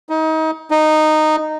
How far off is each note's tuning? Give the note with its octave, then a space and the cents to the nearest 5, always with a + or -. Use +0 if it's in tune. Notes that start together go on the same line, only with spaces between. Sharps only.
D#4 +30
D#4 -10